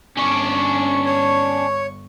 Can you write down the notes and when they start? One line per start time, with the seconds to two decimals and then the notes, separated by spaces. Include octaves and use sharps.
0.17 G1 C#4 D4 C#6
1.06 C#5 C#6